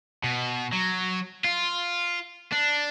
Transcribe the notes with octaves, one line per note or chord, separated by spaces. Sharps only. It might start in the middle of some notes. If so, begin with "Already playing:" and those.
B2
F#3
F4
D4